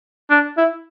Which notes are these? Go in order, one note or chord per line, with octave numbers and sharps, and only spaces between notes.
D4
E4